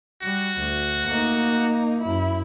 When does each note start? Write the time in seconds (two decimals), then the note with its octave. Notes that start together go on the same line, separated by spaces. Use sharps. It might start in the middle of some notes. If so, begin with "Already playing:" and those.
0.23 G3 F#4
0.59 D2
1.08 A#3 D#4
2.01 F#2 E4